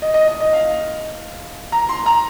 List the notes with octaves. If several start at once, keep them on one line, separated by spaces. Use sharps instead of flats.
D#5
D#5
D#5
D#5
F5
A#5
C6
A#5